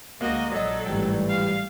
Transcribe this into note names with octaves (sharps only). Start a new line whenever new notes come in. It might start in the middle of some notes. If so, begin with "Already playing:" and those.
D2 G#3 A#3 F#4 D#5
A#1 F#3 A4 D5 D#5
G#1 A2 E3 G3 A3 G5
F5